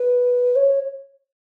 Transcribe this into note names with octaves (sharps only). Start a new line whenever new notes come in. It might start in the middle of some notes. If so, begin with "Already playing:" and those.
Already playing: B4
C#5